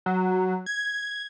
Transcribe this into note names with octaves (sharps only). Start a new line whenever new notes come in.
F#3
G#6